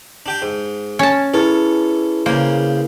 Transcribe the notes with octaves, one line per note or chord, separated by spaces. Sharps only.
D4 G4 G5
G#2
C#4 A5
E4 G#4 A4 B4 C#5
C#3 A#3 C5